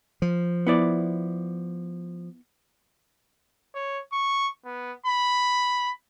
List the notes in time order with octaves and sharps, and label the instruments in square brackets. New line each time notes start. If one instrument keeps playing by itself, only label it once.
[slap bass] F3
[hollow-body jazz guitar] B3 E4 D5
[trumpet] C#5
C#6
B3
B5